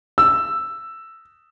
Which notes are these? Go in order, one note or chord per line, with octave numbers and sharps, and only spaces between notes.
E6